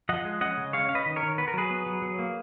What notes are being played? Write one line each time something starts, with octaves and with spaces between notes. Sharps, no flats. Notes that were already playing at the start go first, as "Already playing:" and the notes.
F3 D#5 F#5
G#3
C#4 D#5 F#5
C#3
G#3 C#5 F5
C#4 F5
B4 D#5
D#3
A#4 C#5
D#3
B3 B4
A#4
F#3 G#4 B4
B3
F#3
F#3
A#3